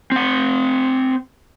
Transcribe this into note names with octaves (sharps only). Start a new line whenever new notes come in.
C4 F#5